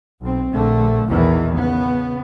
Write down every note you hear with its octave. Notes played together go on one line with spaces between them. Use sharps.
B1 C4
A#1 D3 A3
A#1 E2 B2 D#3 E3
C#3 B3